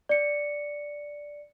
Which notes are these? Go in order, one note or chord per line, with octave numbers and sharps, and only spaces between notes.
D5 C#7